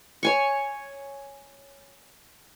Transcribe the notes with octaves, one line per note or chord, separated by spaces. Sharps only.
C#5 G#5 C#6